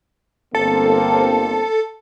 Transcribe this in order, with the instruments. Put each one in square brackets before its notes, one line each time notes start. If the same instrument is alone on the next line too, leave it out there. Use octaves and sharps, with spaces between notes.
[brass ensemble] G1 A#3 C4 [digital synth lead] A4